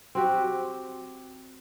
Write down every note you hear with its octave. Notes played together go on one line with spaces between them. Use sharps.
C4 F#4 G4